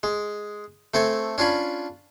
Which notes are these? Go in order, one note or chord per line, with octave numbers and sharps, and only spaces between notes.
G#3
A3 C4 A4 G#5
C#4 D4 F4 G#5 B5